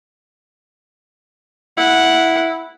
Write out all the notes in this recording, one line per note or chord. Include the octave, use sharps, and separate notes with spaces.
E4 F#5